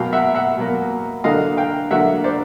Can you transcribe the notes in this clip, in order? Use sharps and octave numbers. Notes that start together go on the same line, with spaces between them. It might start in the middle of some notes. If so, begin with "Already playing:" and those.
Already playing: B2 F#3 A#3 F5 G5
E5 F#5
E5 F#5
B2 F#3 A#3
D3 F#3 A#3 D#5 F5
F5 G5
D3 F#3 A#3 E5 F#5
C5 D5